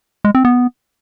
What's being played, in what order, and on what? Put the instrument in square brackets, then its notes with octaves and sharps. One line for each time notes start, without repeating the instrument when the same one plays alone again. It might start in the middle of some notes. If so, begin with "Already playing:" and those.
[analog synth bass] G#3
C4
B3